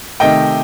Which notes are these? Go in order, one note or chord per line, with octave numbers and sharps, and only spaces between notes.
C3 D#3 A3 D#5 G5